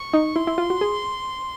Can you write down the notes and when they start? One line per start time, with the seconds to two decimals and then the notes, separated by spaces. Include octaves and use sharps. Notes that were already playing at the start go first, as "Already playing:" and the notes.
Already playing: C#6
0.13 D#4
0.35 E4 C6
0.47 E4
0.58 F4
0.70 F#4
0.81 G#4